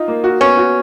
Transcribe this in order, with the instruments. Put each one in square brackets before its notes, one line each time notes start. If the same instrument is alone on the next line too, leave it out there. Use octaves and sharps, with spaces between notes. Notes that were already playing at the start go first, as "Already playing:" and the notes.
Already playing: [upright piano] D#4 F4
A#3
F#4
[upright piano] B3 [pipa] C#4
[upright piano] F#4